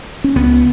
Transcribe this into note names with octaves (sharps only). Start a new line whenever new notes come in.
C#4
C#2 B3